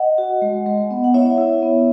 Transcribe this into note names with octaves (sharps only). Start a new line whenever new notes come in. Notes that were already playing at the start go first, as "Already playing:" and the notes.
Already playing: D#5 F#5
F#4
G#3
G#3
B3
F#5
E4 C#5 E5
E4
B3